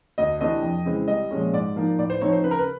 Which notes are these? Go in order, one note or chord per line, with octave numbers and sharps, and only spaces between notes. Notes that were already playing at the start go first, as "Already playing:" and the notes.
D2 D#5
C3 E3 A3 D4 D#5
F2
C#3 E3 G#3 C4
C2 D#5
A#2 F3 G#3 C#4
G#2 D5
F3 A#3 D#4
A2 D5
C5
F3 A3 C4 D#4 C#5
C5
C#3 B4
A#4
B4